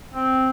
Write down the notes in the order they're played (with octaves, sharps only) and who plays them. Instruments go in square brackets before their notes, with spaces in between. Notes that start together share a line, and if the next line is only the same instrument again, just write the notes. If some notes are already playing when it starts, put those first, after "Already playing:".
[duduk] C4